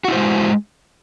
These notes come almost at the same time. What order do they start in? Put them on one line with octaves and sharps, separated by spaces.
F#4 E4 C5 G#3